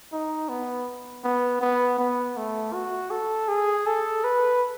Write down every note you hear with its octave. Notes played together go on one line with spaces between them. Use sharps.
D#4
B3
B3
B3
B3
A3
F#4
A4
G#4
A4
B4